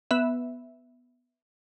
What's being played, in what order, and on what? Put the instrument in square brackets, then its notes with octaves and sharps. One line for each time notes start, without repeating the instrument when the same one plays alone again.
[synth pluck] B3 E5